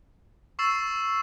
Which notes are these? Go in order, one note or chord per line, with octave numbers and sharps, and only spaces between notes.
C#6 E6 A6 C7 E7